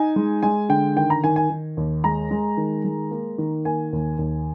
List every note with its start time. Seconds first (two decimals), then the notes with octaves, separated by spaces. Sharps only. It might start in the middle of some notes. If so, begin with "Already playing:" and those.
Already playing: D#4 G#5
0.16 G#3
0.43 G#3 G#5
0.69 D3 G5
0.96 D#3 G5
1.10 A#5
1.24 D#3 G#5
1.36 G#5
1.50 D#3
1.77 D#2
2.04 G#3 A#5
2.31 G#3
2.57 D#3
2.85 G#3
3.11 A#3
3.38 D#3
3.65 A#3 G#5
3.93 D#2
4.18 D#2